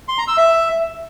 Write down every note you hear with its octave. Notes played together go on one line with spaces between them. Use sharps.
C6
A#5
E6
E5